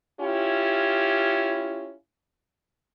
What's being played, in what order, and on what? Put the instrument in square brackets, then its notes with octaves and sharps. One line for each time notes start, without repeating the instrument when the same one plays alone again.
[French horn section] C#4 E4 F4 G4